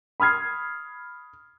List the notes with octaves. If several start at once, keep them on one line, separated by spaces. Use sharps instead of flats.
B5 D#6 F6 G#6 C7